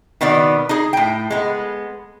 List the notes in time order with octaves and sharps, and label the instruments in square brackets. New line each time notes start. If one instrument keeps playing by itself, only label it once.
[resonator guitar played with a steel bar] B2 D#3 B3 D5
D#4 G#4
A2 G5
G#3 B3